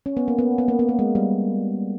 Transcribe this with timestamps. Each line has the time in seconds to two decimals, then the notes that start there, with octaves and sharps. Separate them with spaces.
0.06 C#4
0.17 B3
0.28 A#3
0.39 B3
0.58 B3
0.68 A#3
0.79 B3
0.89 A#3
0.99 G#3
1.15 G3